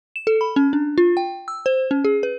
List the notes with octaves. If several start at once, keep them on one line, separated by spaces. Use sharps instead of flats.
E7
A4
B5
C#4
D4
F4
G5
E6
C5
C#4
G#4
B4